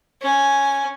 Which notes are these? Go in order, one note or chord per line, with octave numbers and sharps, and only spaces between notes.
C#4 G#5